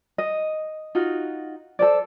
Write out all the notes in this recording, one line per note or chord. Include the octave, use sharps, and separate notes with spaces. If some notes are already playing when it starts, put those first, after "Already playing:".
D#5
D#4 F4 F#4
A4 C5 D5